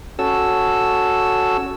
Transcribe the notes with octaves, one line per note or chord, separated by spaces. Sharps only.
C#4 F#4 A4 E6